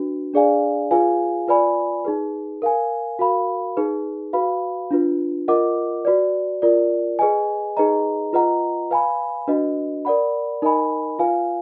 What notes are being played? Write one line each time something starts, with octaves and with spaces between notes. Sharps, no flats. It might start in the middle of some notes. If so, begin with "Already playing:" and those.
Already playing: D4 F#4 B4
D4 G#4 D5 F5 G#5
F4 G#4 B4 F5 G#5
F4 B4 D5 G#5 B5
D#4 G#4 B4
A#4 F5 G#5
F#4 A#4 F5 B5
D#4 G#4 B4
F#4 B4 F5 B5
D4 F4 B4
F4 A#4 D#5 F#5 D6
F#4 B4 D5
F4 A#4 D5
G#4 B4 D#5 G#5
D#4 G#4 B4 D#5 A#5
F4 B4 D#5 F#5 A#5
B4 F5 G#5 B5
D4 F#4 B4 D#5
A#4 D5 F#5 B5
D#4 A#4 D#5 G#5 B5
F4 B4 F5 G#5